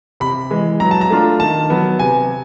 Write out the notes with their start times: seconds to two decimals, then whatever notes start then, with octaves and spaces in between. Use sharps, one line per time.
0.20 C3 B5
0.51 E3 G#3
0.80 F#3 A#5
0.91 A5
1.01 A#5
1.10 A3 D4 F4
1.40 D#3 A5
1.70 F#3 B3
1.99 C3 G#5